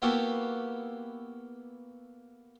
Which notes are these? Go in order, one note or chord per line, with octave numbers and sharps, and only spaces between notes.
A#3 B3 E4 F#4 G4 A4